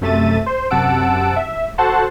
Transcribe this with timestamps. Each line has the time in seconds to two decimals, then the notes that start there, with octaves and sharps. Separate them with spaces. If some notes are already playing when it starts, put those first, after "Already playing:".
0.01 F#2 C3 A3 E5 A6 D#7
0.46 C5
0.70 F#2 C3 F#5 A5 E6 D7
1.36 E5
1.78 F#4 A4 C5 F#5 A5 C6